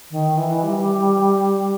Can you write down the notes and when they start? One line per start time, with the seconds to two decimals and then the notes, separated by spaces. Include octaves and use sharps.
0.11 D#3
0.37 E3
0.63 G3